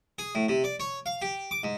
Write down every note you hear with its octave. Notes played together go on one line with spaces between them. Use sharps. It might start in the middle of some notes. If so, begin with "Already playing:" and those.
G#4
A2
C3
D5
C#5
F5
G4
D6
G#2